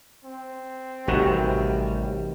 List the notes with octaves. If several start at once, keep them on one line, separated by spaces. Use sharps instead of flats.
C4
A1 C3 D#3 G3 F#4